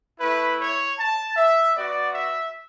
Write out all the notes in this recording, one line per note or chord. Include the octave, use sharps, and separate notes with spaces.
A3 E4 B4
C#5
A5
E5
B3 F#4 D5
E5